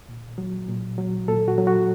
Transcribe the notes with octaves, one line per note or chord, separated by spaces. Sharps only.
A#2
F#3
A#2
F#3
A#2 A4
F#4
F#3
F#4